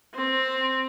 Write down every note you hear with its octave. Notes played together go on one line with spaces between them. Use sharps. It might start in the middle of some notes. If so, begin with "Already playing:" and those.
C4